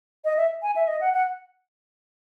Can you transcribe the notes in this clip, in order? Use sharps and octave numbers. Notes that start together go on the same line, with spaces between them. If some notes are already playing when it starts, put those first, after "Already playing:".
D#5
E5
G#5
E5
D#5
F#5
F#5